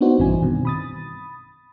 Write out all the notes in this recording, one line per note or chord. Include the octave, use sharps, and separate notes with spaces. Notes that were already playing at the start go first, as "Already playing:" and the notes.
B3 D4 D#4 F#4 C5
A#1 G2 E3 C4 E4 G#5
G2 B2 D#3
B5 D#6 A6